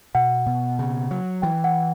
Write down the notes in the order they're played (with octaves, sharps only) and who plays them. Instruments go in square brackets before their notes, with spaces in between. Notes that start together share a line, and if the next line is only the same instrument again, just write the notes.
[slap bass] B2 [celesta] F#5
[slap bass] B2
C#3
F#3
[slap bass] E3 [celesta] G5
[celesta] F#5